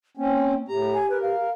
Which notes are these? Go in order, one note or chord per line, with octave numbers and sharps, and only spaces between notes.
A#3 C4 C#4
A2 G4 A#5
G#5
A#4 B4
F5